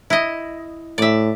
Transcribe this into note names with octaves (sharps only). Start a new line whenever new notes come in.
E4 D#5
A2 D5 E5